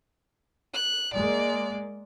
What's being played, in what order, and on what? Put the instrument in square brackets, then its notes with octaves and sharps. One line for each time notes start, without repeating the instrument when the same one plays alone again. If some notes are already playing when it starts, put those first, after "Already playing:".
[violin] F#6
[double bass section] G#3 A#3 [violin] D5